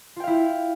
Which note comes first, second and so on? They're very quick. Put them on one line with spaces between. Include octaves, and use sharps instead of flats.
F4 G5 F5 E4